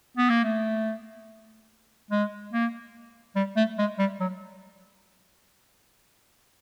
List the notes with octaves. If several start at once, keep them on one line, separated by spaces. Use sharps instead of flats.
B3
A#3
A3
G#3
A#3
G3
A3
G#3
G3
F#3